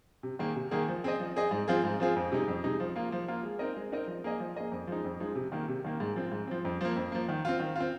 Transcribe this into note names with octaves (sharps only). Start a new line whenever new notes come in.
C3
D#3 A#3 G#4
C3
D#3 A#3 G#4
F3
C4 G#4 D#5
F3
C4 G#4 D#5
G#2
F3 C4 F4 G#4
G#2
F3 C4 F4 G#4
F2
C3 G#3 D#4
F2
C3 G#3 D#4
F3
A#3 F4
F3
A#3 F4
G#3
C4 D#4 A#4 D#5
G#3
C4 D#4 A#4 D#5
F3
A#3 G#4 D#5
F3
A#3 G#4 D#5
F2
F3 G#3 D#4
F2
F3 G#3 D#4
C3
D#3 A#3
C3
D#3 A#3
G#2
F3 C4
G#2
F3 C4
F2
F3 A#3
F2
F3 A#3
D#3
C4 F4
D#3
C4 F4